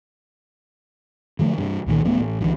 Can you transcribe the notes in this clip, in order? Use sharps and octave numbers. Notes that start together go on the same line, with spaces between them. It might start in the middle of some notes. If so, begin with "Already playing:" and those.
D3 F3 F#3 A3
G2 C3
C2 A#2 D#3
D1 F#3 A3 B3
A1
C2 D3 E3 F#3